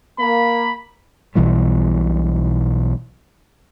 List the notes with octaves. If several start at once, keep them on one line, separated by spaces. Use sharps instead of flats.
A#3 B5
B1 B2 E3 G3